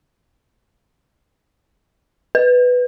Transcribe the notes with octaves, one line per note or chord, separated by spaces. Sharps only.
B4